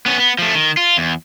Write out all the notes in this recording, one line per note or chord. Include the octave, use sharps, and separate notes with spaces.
B3 C#4
B3
F3 A3
D#3
F4
E2